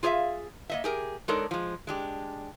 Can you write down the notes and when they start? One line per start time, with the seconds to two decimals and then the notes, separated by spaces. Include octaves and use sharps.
0.03 F4 G#4 C#5 D5 E5 F5
0.70 A#3 D#5 E5
0.84 G4 G#4 A#4
1.28 G#3 D4 D#4 A4 A#4 C#5
1.51 F3 G#3
1.87 G#3 D4 G4